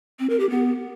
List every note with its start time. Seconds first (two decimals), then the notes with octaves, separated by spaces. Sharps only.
0.19 C4
0.30 A#4
0.40 G4
0.50 B3